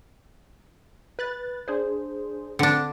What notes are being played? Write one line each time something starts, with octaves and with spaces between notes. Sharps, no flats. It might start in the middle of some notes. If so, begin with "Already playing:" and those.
B4 F#6 A6
D4 G#4 C5
D3 C4 D4